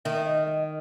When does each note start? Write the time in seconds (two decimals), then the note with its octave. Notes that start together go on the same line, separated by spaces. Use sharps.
0.05 D#3 E5
0.26 D#5
0.47 D#5